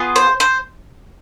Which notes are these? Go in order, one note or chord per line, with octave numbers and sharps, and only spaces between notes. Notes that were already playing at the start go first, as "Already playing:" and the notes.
Already playing: B3 F4 G#4
C5
C5